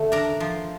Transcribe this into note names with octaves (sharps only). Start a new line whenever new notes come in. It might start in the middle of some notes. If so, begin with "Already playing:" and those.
Already playing: D3 A3
D4 A#4
F3